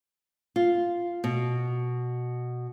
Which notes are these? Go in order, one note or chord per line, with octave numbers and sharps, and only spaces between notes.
F4
B2